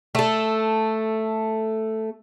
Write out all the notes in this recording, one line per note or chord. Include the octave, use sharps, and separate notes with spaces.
A3 A4